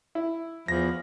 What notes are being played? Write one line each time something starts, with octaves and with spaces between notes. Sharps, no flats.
E4
E2 F3 A#6